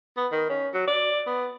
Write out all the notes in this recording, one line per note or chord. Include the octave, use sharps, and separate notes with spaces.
B3
D#3
C#4
F#3
D5
B3